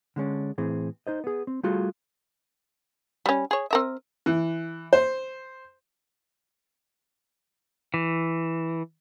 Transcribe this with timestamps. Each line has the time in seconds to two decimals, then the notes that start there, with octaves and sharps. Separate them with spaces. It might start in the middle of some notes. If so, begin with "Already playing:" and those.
0.16 D3 G#3 C#4 D4
0.58 A2 E3 C4 G#4
1.07 D#4 C5 D#5
1.24 B3 G#4
1.47 C4
1.63 G3 A3 F4 F#4 G#4
3.26 G3 C#4
3.51 G#4 C#5
3.71 C4 A#4 E5
4.26 E3
4.93 C5
7.94 E3